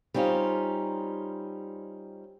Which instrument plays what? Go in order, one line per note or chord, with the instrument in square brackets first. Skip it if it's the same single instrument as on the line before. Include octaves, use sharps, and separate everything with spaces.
[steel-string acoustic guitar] G3 C4 C#4 D#4 F4